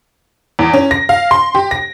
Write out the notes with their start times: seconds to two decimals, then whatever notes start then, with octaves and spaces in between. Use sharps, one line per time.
0.59 E2
0.73 C#4
0.91 A#6
1.09 F5
1.31 C6
1.55 G4
1.71 A#6